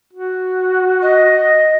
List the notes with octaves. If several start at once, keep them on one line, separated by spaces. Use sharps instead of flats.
F#4
D#5